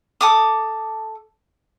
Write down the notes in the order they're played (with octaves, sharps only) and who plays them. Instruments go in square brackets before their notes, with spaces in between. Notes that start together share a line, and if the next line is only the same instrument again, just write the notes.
[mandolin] A4 D6 D#6